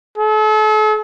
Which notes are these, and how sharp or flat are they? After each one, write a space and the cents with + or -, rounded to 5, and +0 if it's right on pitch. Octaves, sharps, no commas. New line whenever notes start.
A4 -40